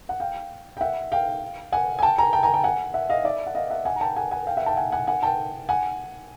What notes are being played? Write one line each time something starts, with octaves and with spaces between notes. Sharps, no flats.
F#5
F5 G5
G5
E5 F#5
F5 G5
F#5 G#5
G#5
G5 A5
G#5 A#5
G5 A5
G#5 A#5
G5 A5
F#5 G#5
E5 F#5
D#5 F5
D5 E5
F#5
D#5 F5
E5 F#5
F#5 G#5
A#5
G5 A5
F#5 G#5
F#5 G#5
F5 G5
E5 F#5
G5 A5
F#5 G#5
F#5 G#5
F#5 G#5
G5 A5
F#5 G#5